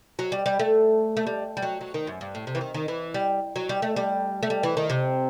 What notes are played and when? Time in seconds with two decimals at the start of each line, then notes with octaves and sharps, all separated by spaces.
0.19 F#3
0.32 G3
0.46 G3
0.59 A3
1.17 A3
1.27 G3
1.57 G3
1.62 F#3
1.81 F#3
1.94 D#3
2.07 F#2
2.21 G2
2.35 A2
2.47 C3
2.55 E3
2.61 D#3
2.74 D#3
2.88 E3
3.14 G3
3.56 F#3
3.69 G3
3.82 A3
3.96 G3
4.43 A3
4.50 G3
4.63 E3
4.77 D#3
4.90 C3